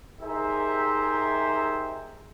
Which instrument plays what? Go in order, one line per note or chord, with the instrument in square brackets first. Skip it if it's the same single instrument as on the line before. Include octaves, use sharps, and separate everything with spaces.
[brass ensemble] D#4 G4 G#4 A#4 C5 E5